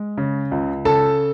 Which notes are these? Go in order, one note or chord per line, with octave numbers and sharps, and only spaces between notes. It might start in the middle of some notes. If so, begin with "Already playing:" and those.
Already playing: G#3
C#3
C#2
C#3 A4 A5